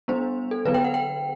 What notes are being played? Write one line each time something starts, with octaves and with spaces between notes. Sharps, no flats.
G3 B3 D4 C5
A4
D3 F#3 B3 B4
G5
F#5
G5